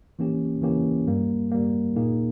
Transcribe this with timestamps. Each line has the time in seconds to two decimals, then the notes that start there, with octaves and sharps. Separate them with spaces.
0.19 E3 A#3 C#4 G4
0.62 E3 A#3 C#4 G4
1.07 G2 G3 A#3
1.52 G2 G3 A#3
1.96 A#2 A#3 D#4 G#4